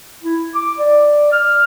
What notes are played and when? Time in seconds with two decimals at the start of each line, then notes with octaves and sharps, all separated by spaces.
0.23 E4
0.55 D6
0.79 D5
1.32 F6